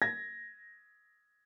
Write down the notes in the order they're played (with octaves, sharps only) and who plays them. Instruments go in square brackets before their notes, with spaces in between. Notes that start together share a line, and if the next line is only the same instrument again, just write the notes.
[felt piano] G#6 A#6